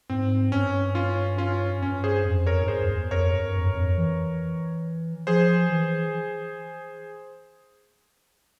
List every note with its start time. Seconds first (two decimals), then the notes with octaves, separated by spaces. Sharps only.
0.10 G#2 C4
0.52 G2 C#4
0.95 C#4 F4
1.38 C#4 F4
1.82 G2 C#4
2.04 G#4 C5
2.25 F2
2.47 A#4 C#5
2.61 G#2
2.68 G2 G#4 C5
2.82 F2
2.90 E2
3.11 F2 A#4 C#5
3.32 G2
3.55 F2
3.65 G2
3.75 F2
3.97 E3
5.27 F3 G#4 C5
5.70 E3